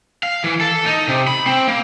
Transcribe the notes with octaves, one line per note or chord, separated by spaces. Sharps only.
F5
E3
A4
D#4
C3
B5
C4
A#3